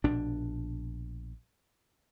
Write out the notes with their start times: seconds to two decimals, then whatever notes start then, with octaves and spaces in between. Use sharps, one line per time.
0.04 A#1 B2 D4